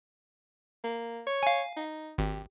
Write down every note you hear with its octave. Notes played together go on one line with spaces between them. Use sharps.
A#3
C#5
F5 G#5
D#4
G#1 G4